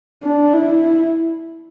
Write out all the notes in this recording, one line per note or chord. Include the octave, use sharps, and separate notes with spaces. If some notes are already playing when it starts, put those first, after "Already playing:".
D4
E4